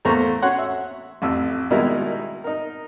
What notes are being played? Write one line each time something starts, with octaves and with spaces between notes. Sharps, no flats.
E2 A3 A#3 C5 A#5 C#6
C#4 F#4 C#5 F#5 C6
E5
A1 F2 E6
B2 D#3 G3 G#3 E4 A#4
D#4 A#4